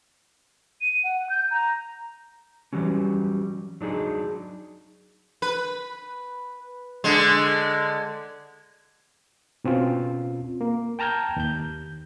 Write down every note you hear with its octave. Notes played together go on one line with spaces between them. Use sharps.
D#7
F#5
G6
A#5
E3 F#3 G3 C#4
F#3 D4 D#4 G#4
B4
D3 G#3
B2 C4 C#4 F4
A#3
G5 A5 A#5 F6 G6 G#6
D#2 G6